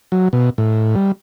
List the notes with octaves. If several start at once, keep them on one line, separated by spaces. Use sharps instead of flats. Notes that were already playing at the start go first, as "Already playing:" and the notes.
F#3
B2
A2
G3